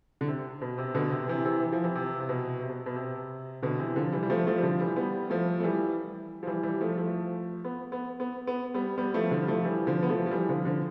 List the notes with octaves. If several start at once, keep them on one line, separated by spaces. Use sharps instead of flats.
D3
C3
B2
C3
B2 D3
C3
C3 E3
C3 E3
E3
F3
C3 E3
C3
C3
B2
C3
B2
B2
C3
B2 D3
C3 E3
D3 F3
E3 G3
G3
F3 A3
F3 A3
G3
D3 F3
E3 G3
G3 B3
F3 A3
A3
E3 G3
F3
E3 G3
E3 G3
F3 A3
F3 A3
B3
B3
B3
B3
G3 B3
G3 B3
F3 A3
D3 F3
G3
F3 A3
E3 G3
D3 F3
B3
F3 A3
F3
E3 G3
D3 F3
D3 F3